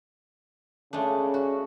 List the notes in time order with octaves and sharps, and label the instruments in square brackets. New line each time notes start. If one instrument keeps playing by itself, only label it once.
[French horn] C#3 [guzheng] G#3 A3 D4
[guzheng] F#4